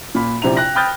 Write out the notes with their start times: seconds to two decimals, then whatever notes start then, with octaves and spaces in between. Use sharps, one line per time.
0.15 A#2 B5
0.42 A#1 C3 C4 E4 A#5 F7
0.56 G5 F#6 A#6
0.75 G5 B5 D#6 F6 G6 A6